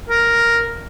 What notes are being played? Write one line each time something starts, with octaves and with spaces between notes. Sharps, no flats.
A#4